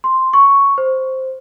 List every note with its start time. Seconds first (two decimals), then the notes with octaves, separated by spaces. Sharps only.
0.04 C6
0.33 C#6
0.78 C5